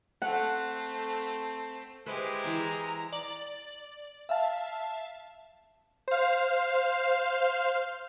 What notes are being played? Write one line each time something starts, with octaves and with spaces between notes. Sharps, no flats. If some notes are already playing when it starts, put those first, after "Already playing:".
A3 C4 F#5
G#3 E4 G4 B4 C5
E3 G#4 E5 A#5
D5 F#7
E5 F5 A5
C5 F5